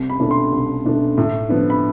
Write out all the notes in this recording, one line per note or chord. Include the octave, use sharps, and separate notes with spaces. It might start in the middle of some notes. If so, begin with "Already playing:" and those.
Already playing: C2
B5
B2 A3 D4
C6
C2
B2 A3 D4
A2
F3 B3 D4
B5